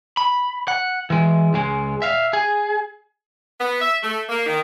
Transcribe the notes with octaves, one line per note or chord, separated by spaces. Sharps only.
B5
F#5
E3 G#3
C#2 G#3
E5 F5
G#4
B3
E5
A3
A#3
D#3